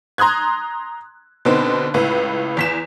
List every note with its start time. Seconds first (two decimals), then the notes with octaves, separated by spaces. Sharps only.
0.18 A#5 C6 D#6 F#6 G#6
1.45 B2 D3 B3 C4 D#4
1.94 C#2 A2 B4
2.57 E2 B6 E7